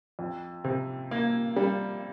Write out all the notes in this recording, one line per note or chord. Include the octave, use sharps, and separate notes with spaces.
F2
C3
A#3
G3